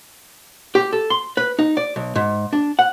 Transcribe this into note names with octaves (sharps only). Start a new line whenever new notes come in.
G4
A4
C6
B4
D#4
D5
B1
G#2
D4
F#5